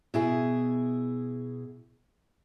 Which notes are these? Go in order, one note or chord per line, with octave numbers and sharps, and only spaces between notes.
B2 E4 G#4